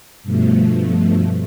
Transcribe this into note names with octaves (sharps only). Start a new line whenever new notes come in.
G2 B2 F3 A3